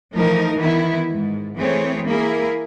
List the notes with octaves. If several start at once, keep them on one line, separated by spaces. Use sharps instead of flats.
E3 F3 A3 D#4 A#4
D#3 E3 B3 E4
G#2
E3 A3 C4 G#4 C#5
A#3 E4 G#4 A#4